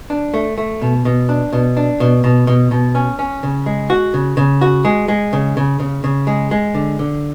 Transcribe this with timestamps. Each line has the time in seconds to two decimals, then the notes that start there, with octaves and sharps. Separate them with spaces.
0.10 D4
0.34 A3
0.58 A3
0.82 B2
1.05 B2
1.29 D4
1.53 B2
1.77 D4
2.00 B2
2.24 B2
2.47 B2
2.71 B2
2.95 C#4
3.19 C#4
3.43 C#3
3.66 G#3
3.90 F#4
4.14 C#3
4.37 C#3
4.61 F#4
4.85 G#3
5.08 G#3
5.33 C#3
5.57 C#3
5.80 C#3
6.04 C#3
6.27 G#3
6.51 G#3
6.75 D3
6.99 D3